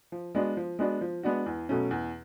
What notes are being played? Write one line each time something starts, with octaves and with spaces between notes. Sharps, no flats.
F3
G#3 B3 D4 F#4
F3
G#3 B3 D4 F#4
F3
G#3 B3 D4 F#4
E2
B2 F#3 A3 C#4
E2